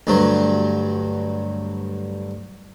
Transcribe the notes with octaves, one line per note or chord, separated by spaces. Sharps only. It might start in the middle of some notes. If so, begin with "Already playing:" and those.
D2 G2 F#3